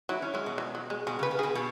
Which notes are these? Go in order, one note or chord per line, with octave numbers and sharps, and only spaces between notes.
F#3 E4
C#4
F#3 G#3
B2
E3
F#3
G#3
B2 G#4
C#3
B4
C#3
G#4
B2
B2